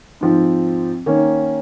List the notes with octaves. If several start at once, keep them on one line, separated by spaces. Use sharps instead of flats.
G#2 F3 C4
D#3 A#3 C#4